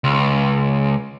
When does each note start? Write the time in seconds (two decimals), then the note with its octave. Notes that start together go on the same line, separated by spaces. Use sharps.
0.04 C#2